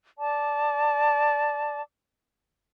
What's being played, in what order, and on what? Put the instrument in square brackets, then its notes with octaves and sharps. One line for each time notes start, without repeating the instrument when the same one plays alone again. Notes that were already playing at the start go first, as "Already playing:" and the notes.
[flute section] D5 A5 D6